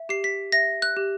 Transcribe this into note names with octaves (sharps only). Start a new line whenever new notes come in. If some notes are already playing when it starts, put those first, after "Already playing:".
Already playing: E5
G4 C7
B6
E5 A#6
F#6
G4